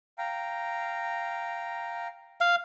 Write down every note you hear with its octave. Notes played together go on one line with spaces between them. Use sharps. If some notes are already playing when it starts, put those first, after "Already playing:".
F5 G5 A#5
F5